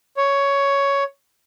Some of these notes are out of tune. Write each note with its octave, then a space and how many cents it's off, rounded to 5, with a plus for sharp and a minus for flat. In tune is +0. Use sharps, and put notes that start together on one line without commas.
C#5 +10